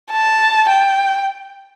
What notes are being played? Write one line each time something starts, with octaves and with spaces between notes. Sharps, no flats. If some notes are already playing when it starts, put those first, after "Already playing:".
A5
G5